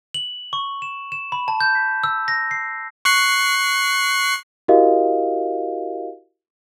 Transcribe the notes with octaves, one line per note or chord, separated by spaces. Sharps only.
F#7
C#6
E7
E7
B5
A5
G6
B6
E6
A#6
C7
C#6 F#6 C7
E4 F#4 G4 A#4 D#5 F5